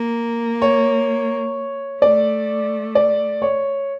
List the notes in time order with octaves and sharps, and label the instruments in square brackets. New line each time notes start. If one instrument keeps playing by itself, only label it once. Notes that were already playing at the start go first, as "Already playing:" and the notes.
Already playing: [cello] A#3
[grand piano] C#5
[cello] A3 [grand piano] D5
[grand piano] D5
C#5